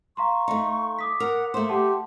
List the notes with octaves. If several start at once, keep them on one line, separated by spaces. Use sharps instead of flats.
F5 A#5 C6 C#6
A3 D#4
D6 D#6 B6
A#4 F#5
A3 A#3 C5
G4 F#5 A5 C6